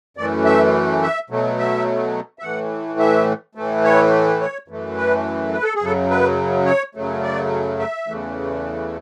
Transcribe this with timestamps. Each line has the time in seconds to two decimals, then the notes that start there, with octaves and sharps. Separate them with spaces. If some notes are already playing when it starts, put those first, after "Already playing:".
0.17 F#2 E3 A3 D5
0.45 E5
1.02 E5
1.30 B2 F#3 A3
1.58 E5
2.39 E5
2.42 A2 E3 A3 F#5
2.99 E5
3.55 A2 E3 A3
3.84 C#5
4.41 C#5
4.68 F#2 E3 A3
4.97 B4
5.53 B4
5.63 A4
5.75 G#4
5.81 F#2 C#3 F#3 A4
6.10 B4
6.66 C#5
6.95 F#2 C#3 F#3 A3
7.23 D5
7.79 E5
8.08 E2 C#3 E3 A3